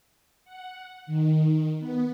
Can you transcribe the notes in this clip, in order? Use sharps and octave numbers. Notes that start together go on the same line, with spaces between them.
F#5
D#3
B3